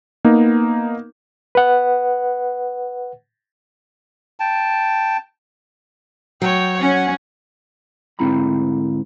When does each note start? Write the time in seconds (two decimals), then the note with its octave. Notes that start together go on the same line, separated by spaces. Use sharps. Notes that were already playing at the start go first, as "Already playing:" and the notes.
0.25 A#3 B3 D#4
1.55 B4 F#5
4.40 G5 A5
6.42 F#3 C#5 G5
6.80 C#4 F#5
8.19 D2 G#2 C4 E4 A#5 B5